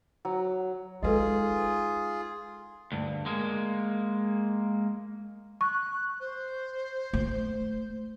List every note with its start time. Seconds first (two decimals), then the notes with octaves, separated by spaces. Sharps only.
0.25 F#3
1.03 G#3 D#4 F4 G#4 A4 B4 D#5
2.92 D2 G2
3.26 G#3 A#3
5.61 C#6 F#6
6.20 C5
7.13 A3